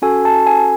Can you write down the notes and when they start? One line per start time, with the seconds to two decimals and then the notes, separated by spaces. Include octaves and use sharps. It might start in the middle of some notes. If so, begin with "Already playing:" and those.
0.02 C#4 F#4 A4 G#5
0.25 A5
0.47 G#5